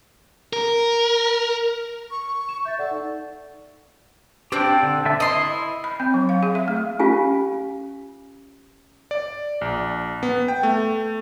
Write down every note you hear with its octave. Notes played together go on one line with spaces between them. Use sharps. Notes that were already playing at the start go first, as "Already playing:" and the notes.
A#4
C#6
E7
E5 G6 A6
A4 D5 F#5
D#4
C4 D4 G4 G5
D3
D3 E5 A5
E4 D#5 C6
B5
C4
F#3
F5
G#4
E5
A3
C#4 F4 G4 F5 G#5
D5
A#1
B3
G5
A3